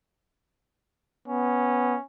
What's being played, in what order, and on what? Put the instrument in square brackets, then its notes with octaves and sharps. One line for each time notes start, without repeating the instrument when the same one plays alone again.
[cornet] B3 [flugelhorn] C#4